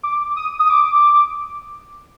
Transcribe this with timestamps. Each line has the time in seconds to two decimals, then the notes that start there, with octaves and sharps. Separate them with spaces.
0.03 D6
0.36 D#6
0.59 D#6
0.70 D6